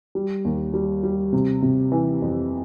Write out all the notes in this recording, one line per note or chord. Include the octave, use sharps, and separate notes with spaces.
G3
D#2
G3
G3
C3
C3
E3
F2